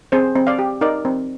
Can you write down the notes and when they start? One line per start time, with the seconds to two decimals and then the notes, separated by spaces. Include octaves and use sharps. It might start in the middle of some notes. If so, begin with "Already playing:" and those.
0.12 C4 G#4 C5
0.36 C4
0.47 D5 F5
0.59 G4
0.81 D#4 A#4 D5
1.05 C4